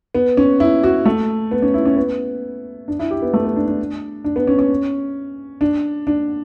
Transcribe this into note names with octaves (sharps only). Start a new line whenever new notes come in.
B3
C#4
E4
F#4
A3
B3
C#4
E4
C#4
B3
D4
E4
G4
B3
A3
B3
D4
D4
D4
B3
C#4
C#4
D4
D4